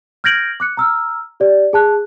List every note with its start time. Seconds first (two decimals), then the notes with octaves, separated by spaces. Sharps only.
0.24 F6 G6 G#6 A#6 D7 F#7
0.60 D6 F#6 C#7
0.77 A#5 E6 F6
1.40 G4 D5
1.73 G#4 A5 F#6